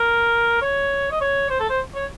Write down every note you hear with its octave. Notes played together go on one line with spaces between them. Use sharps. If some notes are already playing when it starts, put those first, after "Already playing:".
Already playing: A#4
C#5
D#5
C#5
C5
A4
C5
C#5